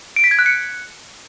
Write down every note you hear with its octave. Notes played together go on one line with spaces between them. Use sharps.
D7
B6
G#6
F#6
C#7